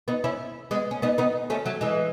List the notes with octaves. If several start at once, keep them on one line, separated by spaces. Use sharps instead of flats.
B3 D#4
C#4 E4
G#3 B3
C#4
B3 D#4
B3 D#4
A3 C#4
F#3 A3
E3 G#3